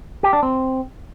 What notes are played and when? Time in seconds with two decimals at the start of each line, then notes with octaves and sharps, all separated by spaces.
0.23 G4
0.33 D4
0.43 C4